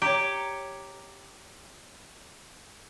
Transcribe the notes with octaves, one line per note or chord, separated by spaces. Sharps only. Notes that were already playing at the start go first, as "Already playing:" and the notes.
G4 C#5 A#5